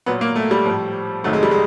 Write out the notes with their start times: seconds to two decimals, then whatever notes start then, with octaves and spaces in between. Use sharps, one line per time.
0.06 A#2 F#3 B3
0.21 A#3
0.36 A3
0.51 G3
0.66 A2 F3
1.24 F2 C3 D#3 F#3 A3
1.33 G#3
1.43 G3
1.51 G#3